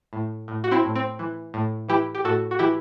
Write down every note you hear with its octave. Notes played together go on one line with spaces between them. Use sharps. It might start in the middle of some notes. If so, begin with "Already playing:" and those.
A2
A2
F#4
C4 E4
A2
C4
E3
A2
E3 E4 G4
G4
A2 F#4 A4
F#4
E3 E4 G4